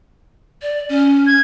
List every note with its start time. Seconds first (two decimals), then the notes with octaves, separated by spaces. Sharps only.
0.62 D5
0.89 C#4
1.27 G#6